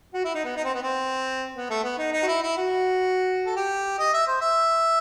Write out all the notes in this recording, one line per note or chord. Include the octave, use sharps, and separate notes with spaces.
F#4
E4
D#4
B3
D#4
C4
B3
C4
B3
A3
B3
D#4
D#4
F#4
E4
E4
F#4
A4
G4
D#5
E5
C5
E5